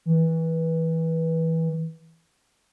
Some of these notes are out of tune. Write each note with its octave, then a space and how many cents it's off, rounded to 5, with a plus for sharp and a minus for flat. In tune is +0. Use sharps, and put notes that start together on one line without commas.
E3 -20